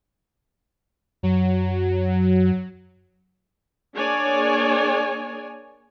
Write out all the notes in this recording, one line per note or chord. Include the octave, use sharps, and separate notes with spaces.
F#2 F#3
A#3 D4 G#4 C#5 D5 G#5